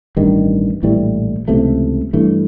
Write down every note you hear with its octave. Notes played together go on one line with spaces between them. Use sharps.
A1 G2 D#3
A#1 A2 E3 G3
C#2 C3 E3 A3
G2 E3 A3